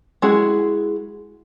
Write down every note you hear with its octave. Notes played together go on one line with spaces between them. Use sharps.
G#3 E4 F#4 G#4